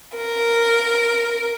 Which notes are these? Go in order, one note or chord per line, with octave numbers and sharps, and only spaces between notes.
A#4